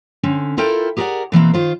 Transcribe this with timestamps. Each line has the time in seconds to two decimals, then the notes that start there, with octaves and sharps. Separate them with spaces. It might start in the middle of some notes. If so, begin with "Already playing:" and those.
0.23 D3 C4 C#4
0.57 E4 F4 A4 A#4 G5
0.97 G4 G#4 A#4 B4 D5 F#5
1.32 B2 E3 A#3 C4
1.53 D#3 F4 C5